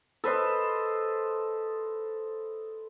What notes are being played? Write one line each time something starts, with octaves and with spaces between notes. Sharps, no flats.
A4 B4 C5 D#5